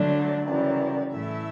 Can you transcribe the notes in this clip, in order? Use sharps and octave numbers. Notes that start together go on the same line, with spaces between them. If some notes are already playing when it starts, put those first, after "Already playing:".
Already playing: D3 F#3 A3 D4
D5
F#2 C#3 E3 G3
A2 E3 A3 E4 E5